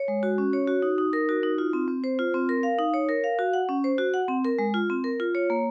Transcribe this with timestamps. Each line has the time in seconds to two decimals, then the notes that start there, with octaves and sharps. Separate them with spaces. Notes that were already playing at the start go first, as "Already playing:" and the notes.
Already playing: C#5
0.08 G#3
0.23 F#4
0.38 C#4
0.53 C#5
0.68 F#4
0.82 D#4
0.98 D#4
1.13 A#4
1.29 F#4
1.43 D#4
1.58 F4
1.73 C4
1.88 C4
2.04 C5
2.19 F4
2.34 C4
2.49 A#4
2.63 F5
2.79 D#4
2.94 C#5
3.09 A#4
3.24 F5
3.39 F#4
3.53 F#5
3.69 C#4
3.84 C5
3.98 F#4
4.14 F#5
4.28 C4
4.45 A#4
4.58 G#3
4.74 F4
4.90 C4
5.04 A#4
5.20 F4
5.35 C#5
5.50 A#3